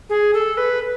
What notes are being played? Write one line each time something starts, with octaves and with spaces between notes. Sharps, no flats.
G#4
A4
B4